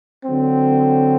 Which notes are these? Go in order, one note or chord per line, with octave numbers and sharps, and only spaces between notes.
D3 F#3 C4